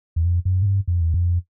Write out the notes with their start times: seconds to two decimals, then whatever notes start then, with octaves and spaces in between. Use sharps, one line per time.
0.16 E2
0.25 F2
0.45 F#2
0.62 G#2
0.66 G2
0.88 F2
1.01 E2
1.14 F2